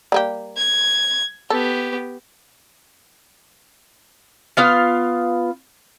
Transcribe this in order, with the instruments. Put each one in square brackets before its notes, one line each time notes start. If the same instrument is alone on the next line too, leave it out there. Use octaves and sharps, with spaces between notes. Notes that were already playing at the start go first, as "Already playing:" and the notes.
[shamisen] G3 A#3 G4
[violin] G#6
[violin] B3 G4 [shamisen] A4
[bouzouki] B3 F4 F5